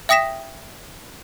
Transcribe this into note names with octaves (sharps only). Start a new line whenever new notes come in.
E5 G5 D#6 A#6 B6 E7